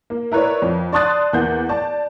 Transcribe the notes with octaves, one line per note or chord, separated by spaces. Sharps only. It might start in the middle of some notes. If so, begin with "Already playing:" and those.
A#3
E4 A#4 B4 C#5 D5
F2
D5 A5 C6 D#6 F#6 A6
E2 A#3 F#5 G6
D5 A5